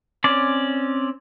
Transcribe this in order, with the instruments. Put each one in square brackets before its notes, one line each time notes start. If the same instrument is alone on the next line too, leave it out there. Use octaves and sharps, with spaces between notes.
[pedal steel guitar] C4 C#4 D5